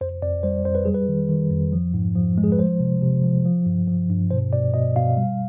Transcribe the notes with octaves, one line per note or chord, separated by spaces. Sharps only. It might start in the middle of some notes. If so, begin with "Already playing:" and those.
F2 C5
F2 D5
G3 C5
F2 C5
B4
G3 G#4
B4
D#3
D#3
F2
F3
G#2
F3
G#3
G#4
B4
F3 C5
C3
C3
F3
F3
G2
F3
G2
B2 C5
B2 D5
B2 D#5
B2 F5
G3